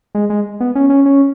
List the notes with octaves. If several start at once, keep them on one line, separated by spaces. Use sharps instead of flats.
G#3
G#3
B3
C#4
C#4
C#4